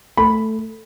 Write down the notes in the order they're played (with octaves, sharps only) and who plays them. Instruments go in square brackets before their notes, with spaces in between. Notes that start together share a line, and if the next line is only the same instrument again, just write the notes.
[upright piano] A3 [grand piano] B5